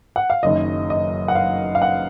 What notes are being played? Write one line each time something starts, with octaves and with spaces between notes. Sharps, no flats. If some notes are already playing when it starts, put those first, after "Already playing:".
F#5
F5
F#1 F#2 D#3 D#5
D#5
F#5
F5
F5
F#5